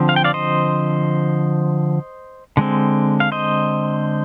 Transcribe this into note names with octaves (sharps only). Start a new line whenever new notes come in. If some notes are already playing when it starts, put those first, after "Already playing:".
Already playing: D3 F3 C4
F5
G5
D5 F5
C5 D#5
D3 G#3 C4
F5
C5 D#5